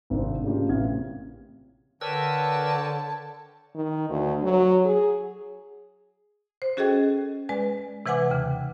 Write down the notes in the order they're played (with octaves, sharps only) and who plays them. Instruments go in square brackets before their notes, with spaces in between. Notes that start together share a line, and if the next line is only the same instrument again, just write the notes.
[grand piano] G#1 C3 C4 D4
C#3 A3 A#3 D4 F4 G4
A1 C3 F5 G#6
[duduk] D3 [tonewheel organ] A#4 B4 E6 [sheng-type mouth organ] C#5 D5 G5 [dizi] A5
[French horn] D#3
D2
F#3
G#4
[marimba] C5
C#4 F#4 G#4 A4 D#5 G5
G#3 B4 D5 G#5
C3 E3 B4 F#5 G#5 D6
D#2 C#3